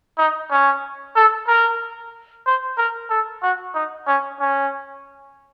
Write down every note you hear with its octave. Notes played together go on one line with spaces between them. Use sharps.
D#4
C#4
A4
A#4
C5
A#4
A4
F#4
D#4
C#4
C#4